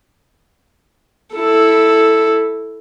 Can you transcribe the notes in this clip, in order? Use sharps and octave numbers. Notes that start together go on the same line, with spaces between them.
E4 A4